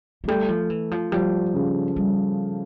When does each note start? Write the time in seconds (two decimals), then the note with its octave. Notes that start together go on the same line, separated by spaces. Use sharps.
0.24 F3
0.28 G3 A3
0.49 F3
0.70 E3
0.91 F3
1.12 F3 G3
1.54 C#3
1.96 G3